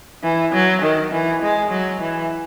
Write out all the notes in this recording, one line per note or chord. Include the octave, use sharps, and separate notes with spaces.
E3
F#3
D#3
E3
G#3
F#3
E3